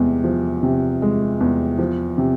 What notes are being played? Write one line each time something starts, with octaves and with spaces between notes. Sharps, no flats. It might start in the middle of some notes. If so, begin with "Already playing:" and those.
Already playing: E2 C3 G#3
F3
C3
G#3
E2
F3
C3